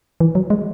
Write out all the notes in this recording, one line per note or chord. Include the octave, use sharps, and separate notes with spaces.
E3
F#3
G#3